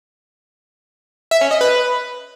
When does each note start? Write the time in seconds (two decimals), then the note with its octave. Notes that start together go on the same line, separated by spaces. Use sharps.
1.31 E5
1.41 C#4
1.51 D#5
1.61 B4